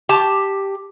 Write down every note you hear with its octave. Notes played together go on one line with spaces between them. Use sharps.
G4 A5